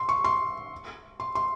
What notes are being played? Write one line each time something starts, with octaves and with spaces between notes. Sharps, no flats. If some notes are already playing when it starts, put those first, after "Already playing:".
Already playing: C6
C#6
C6
C6
C6